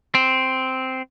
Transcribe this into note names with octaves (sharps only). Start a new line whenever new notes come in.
C4